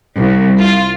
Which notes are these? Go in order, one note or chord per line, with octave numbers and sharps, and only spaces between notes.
C2
F4